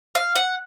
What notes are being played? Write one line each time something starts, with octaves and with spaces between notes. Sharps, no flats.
F5
F#5